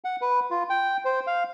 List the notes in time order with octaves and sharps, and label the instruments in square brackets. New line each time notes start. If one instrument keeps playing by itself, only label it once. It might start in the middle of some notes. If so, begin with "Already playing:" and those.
[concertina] F#5
B4
F4
G5
C5
F5